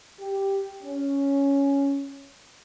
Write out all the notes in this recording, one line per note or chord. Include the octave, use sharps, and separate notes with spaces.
G4
C#4